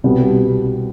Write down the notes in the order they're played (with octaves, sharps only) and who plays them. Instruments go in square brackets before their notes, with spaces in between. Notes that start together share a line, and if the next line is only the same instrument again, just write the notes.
[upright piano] C2 B2 G3 B3